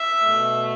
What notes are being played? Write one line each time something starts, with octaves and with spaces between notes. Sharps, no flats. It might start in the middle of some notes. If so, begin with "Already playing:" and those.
Already playing: E5
B2 A3